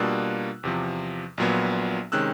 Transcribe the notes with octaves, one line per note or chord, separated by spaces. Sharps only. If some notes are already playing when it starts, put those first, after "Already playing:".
Already playing: B2 G3 A#3 D4 F4 E6 F#6
E2 C3 F3
A#1 A#2 F#3 B3
C3 D#3 G#3 C#4 E6 F#6